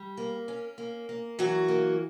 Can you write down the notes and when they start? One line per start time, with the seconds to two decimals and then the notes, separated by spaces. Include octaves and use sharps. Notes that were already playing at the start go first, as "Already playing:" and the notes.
Already playing: G3
0.17 A#3
0.48 C#4
0.78 A#3
1.09 A#3
1.39 E3 F#3 F#4
1.68 A#3